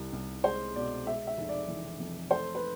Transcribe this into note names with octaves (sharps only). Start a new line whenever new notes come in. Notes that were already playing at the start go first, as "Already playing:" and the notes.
Already playing: C2 C3
C2
G#3 C5
B2 D5
G#3 E5
E5
F1
D5
E3
F2
A3 C5
B4